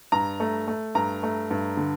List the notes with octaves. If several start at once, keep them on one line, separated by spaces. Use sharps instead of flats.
G2 A#5
A3
A3
G2 A#5
A3
G2
D3